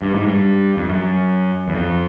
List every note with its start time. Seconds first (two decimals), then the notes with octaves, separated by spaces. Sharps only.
0.02 G2
0.15 G#2
0.27 G2
0.77 F2
0.89 F#2
1.68 E2
1.75 F2